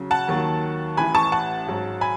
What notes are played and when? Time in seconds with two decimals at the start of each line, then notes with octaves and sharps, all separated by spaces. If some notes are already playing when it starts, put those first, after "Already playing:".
Already playing: C#3 F#3
0.11 F#5 A5
0.28 D#2 D#3 F#3
0.97 A1 A2 E3 G#5 B5
1.15 A5 C#6
1.32 F#5 A5
1.66 G#1 G#2 F#3
2.01 G#5 B5